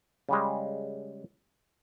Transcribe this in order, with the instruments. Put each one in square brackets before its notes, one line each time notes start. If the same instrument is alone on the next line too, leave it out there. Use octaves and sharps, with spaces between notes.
[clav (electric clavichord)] C#3 G3 G#3